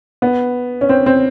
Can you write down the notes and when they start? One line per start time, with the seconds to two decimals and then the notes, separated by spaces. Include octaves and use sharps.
0.22 B3
0.81 C#4
0.89 C4
1.06 C4